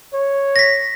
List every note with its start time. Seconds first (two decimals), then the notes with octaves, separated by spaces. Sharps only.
0.14 C#5
0.56 A#6 B6